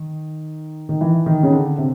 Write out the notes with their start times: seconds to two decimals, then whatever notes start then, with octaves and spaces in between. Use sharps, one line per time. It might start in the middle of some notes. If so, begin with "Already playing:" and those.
Already playing: D#3
0.89 D#3
1.01 E3
1.26 D#3
1.43 C#3
1.52 D3
1.78 C3